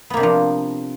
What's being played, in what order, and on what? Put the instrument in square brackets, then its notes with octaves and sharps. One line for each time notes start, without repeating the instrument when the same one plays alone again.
[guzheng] B3
A#3
C3
D4
F3